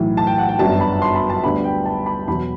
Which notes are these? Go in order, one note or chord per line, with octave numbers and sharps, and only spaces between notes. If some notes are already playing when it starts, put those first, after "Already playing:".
Already playing: B1 A2 E3
A5
G5
F#5
G5
G1 F#2 F#3 B3 D4 A5
B5
C6
B5
A5
D2 D3 G3 B3 B5
G5
A5
B5
E2 B2 F#3 B5